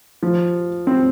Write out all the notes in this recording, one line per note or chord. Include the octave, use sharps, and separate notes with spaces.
F3
C4